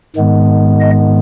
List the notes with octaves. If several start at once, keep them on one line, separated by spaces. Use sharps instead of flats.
G#2 D#3 G#3 B3
D#5